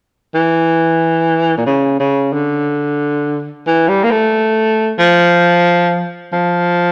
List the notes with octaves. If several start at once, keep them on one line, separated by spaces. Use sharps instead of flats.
E3
A#2
C#3
C#3
D3
E3
G3
A#3
A3
F3
F3